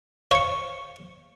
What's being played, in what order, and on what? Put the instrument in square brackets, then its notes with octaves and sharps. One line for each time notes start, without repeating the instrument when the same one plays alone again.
[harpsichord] C5 C#5 F5 [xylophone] C#6 C#7